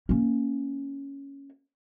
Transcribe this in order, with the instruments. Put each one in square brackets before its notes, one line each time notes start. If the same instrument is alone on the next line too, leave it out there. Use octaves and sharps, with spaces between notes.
[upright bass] A#3 C#4